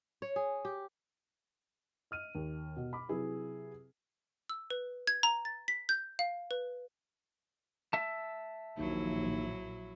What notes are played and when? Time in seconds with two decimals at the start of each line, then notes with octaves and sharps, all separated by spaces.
0.22 C#5
0.36 G#4
0.65 G4
2.11 D#5 F6 D#7
2.35 D#2
2.77 B2
2.93 B5 D6
3.09 C3 F#3 E4 G#4 B4
4.50 E6
4.70 B4
5.07 G#6
5.23 A#5
5.45 A6
5.68 B6
5.89 G6
6.19 F5
6.51 B4
7.93 E5 A5
8.78 A#1 D#2 F#3 E4